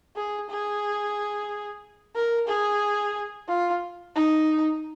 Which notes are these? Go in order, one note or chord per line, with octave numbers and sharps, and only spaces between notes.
G#4
G#4
A#4
G#4
F4
D#4